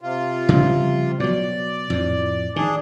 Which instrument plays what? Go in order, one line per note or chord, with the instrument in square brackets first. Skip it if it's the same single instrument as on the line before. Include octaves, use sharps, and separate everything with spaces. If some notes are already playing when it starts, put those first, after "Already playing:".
[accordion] C3 F4
[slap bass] C#3 F3 G3
[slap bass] B2 F#3 [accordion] D5
[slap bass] F2 A2
[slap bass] D#3 [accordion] D4 G#4